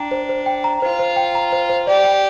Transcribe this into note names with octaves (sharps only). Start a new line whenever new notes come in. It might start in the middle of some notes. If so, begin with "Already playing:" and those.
Already playing: D4 G5 A#5
C5
C5
G5
A#5
F4 C5
C5
G5
A#5
C5
C5
G4 D5
G5